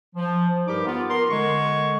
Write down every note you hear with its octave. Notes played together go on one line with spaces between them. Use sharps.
F3
G2 G3 D#4 G4 A#4 D6
B3 F4
A#4 C6
D3 G#3 C#6